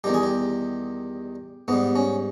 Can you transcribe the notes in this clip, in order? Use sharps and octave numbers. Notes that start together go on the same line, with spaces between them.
E2 D#3 G3 G4
G#4
G4
G#2 G3 B3
C#4